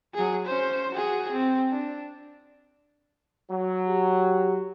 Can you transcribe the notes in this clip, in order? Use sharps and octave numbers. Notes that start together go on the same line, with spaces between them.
F#3 G#4
C#4 C5
F#4 G#4
C4
D4
F#3
G4